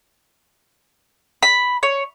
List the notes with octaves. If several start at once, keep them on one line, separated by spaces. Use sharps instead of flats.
B5
C#5